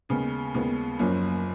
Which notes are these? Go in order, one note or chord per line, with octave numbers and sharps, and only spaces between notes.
D#2 C#3 G#3 B3
D#2 C#3 G#3 B3
F#1 F#2 F3 A#3 C#4